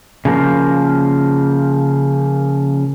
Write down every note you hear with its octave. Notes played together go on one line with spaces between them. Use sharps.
C#3 F3 A#3